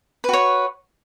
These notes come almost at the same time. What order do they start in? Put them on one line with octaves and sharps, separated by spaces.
B4 F#4 C#5